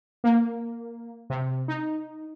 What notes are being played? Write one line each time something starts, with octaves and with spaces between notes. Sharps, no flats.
A#3
C3
D#4